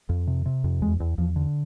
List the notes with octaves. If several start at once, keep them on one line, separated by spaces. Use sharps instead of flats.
F2
C3
C3
F2
E2 G#3
E2
E2 F3
D3